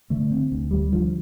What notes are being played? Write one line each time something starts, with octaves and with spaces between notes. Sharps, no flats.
D3 A3
D3 C4
D2
D2 G3
D3 F3